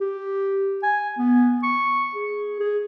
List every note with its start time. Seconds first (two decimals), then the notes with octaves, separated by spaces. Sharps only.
0.01 G4
0.83 G#5
1.18 B3
1.63 C#6
2.15 G#4
2.60 G#4